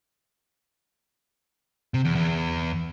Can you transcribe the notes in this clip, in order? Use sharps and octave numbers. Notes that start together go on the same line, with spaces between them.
C3
E2
E2